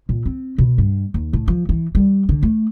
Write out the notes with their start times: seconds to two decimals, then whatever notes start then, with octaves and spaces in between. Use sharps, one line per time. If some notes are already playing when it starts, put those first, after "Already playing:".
0.09 A#2
0.26 C4
0.58 B2
0.78 G2
1.14 D#2
1.33 A2
1.48 F3
1.69 E3
1.95 G3
2.29 D3
2.43 A3